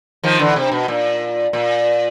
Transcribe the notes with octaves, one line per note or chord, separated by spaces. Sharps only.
D#3 F3
D3 E3
C3
B2
A#2
A#2